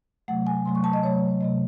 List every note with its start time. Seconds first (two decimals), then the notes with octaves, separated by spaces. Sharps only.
0.28 C3 F#3 A3 F#5
0.47 G#5
0.65 C3 F#3 A3 C6
0.75 C#6
0.84 A5
0.93 D#5
1.03 C3 F#3 A3 C#5
1.41 C3 F#3 A3 D#5